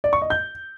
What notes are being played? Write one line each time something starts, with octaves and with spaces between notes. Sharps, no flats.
D5
C#6
D#5
G6